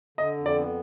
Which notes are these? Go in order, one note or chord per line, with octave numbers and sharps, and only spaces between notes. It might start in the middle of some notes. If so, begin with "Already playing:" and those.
D3 D#5
F2
D5
B3